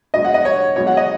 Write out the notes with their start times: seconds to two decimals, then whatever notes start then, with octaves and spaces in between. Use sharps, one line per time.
0.14 B2 G#3 D#5
0.25 F#5
0.34 D#5
0.45 C#5
0.76 B2 G#3 C#5
0.87 F#5
0.97 D#5